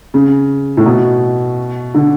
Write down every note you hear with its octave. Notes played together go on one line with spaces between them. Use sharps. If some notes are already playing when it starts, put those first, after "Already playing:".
C#3
A2
B2
D3